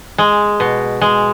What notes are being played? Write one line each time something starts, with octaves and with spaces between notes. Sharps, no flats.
G#3
B2
G#3